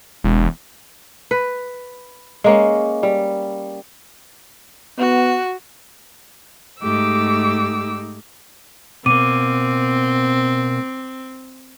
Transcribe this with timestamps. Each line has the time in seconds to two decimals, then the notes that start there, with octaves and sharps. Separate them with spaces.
0.24 E1
1.31 B4
2.44 G#3 A#3 C#4
3.03 G3
4.98 B3 F#4
6.81 G#2 A3 D#4 G4 D6 E6
9.06 B2 A#3 C4 D6 D#7